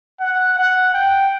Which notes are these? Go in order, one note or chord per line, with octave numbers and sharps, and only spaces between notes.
F#5
F#5
G5